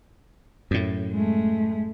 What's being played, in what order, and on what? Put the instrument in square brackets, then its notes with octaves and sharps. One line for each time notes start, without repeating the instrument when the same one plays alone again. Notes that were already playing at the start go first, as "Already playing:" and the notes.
[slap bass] F#2 A2
[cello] G#3 A3